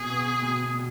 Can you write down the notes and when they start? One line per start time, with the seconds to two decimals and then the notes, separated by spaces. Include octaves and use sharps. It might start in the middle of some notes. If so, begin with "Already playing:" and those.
Already playing: B2 G#4
0.10 B3
0.42 B2
0.74 B2